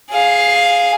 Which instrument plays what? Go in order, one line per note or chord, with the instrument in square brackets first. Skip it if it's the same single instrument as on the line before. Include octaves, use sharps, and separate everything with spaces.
[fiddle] G#4 F5